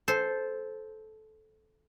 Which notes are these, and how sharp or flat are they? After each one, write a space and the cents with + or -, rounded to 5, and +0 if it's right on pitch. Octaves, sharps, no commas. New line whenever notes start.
A4 -15 C5 +0